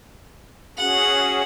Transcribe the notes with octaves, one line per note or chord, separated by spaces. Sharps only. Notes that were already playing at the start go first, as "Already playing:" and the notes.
C#4 F#4 G#4 F#5